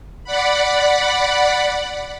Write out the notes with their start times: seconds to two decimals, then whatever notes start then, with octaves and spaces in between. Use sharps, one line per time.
0.24 D5 F#5 B5